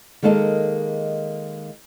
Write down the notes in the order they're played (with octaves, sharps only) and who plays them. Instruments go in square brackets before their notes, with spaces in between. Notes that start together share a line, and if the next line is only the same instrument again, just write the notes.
[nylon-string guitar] D#3 G#3 A#3 A4 D5 D#5